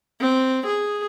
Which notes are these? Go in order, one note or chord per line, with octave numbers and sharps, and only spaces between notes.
C4
G#4